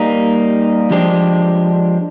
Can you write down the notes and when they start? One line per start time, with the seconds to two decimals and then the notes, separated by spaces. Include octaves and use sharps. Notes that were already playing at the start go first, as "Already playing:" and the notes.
Already playing: G3 A#3 D#4
0.90 F3 G#3 D4 G4 C5